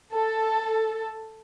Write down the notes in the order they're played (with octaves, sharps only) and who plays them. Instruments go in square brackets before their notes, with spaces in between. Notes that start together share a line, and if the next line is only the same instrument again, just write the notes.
[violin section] A4